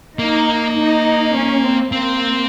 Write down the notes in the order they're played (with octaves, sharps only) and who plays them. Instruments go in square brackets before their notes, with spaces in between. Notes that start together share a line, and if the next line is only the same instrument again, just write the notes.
[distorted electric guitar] A#3 [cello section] D#4
[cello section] D#4
C#4
C4
[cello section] A#3 [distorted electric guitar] C4